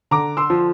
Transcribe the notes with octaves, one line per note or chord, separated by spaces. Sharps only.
D3 A#5 D6
C6 E6
F3